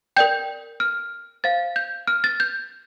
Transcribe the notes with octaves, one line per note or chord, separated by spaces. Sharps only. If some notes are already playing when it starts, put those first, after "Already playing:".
A#4 D5 G5 G6
F6
C5 F5 A6
G6
F6
A6
G6